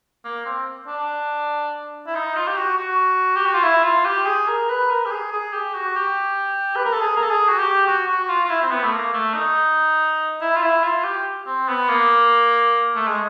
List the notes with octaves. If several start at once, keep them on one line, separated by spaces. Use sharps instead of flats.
A#3
C4
D4
E4
D#4
F4
G4
F#4
F#4
G4
F#4
F4
E4
F4
G4
G#4
A#4
B4
A#4
G4
G#4
G#4
G4
F#4
G4
B4
A#4
A4
G#4
A#4
A4
G#4
F#4
G4
F#4
F#4
F4
F4
E4
C4
B3
A3
A#3
A3
D#4
E4
F4
E4
F4
G4
C4
B3
A#3
A3
G#3